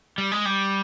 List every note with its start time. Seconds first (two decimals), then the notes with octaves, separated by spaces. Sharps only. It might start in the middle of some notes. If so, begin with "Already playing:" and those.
0.18 G3
0.32 G#3
0.45 G3